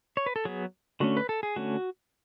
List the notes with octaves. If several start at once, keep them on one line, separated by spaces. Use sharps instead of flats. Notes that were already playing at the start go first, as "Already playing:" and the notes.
C#5
B4
A4
F#3 B3 G#4
D3 A3 C#4 F#4
B4
A4
G#4
D3 A3 C#4 F#4